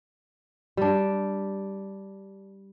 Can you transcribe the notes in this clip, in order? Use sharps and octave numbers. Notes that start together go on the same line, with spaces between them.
G3 D4